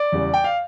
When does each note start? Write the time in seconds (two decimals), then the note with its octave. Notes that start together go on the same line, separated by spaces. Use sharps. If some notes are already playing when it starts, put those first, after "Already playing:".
Already playing: D5
0.12 E2 C#3 G3
0.34 G5
0.44 F5